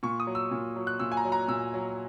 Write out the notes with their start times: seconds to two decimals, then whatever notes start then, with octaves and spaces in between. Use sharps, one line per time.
0.03 A#2 C#6
0.20 D#6
0.27 F#3
0.35 E6
0.51 A#2
0.76 F#3
0.87 F#6
1.00 A#2 E6
1.12 G#5
1.17 A#5
1.25 F#3
1.32 A#5
1.48 A#2 E6
1.74 F#3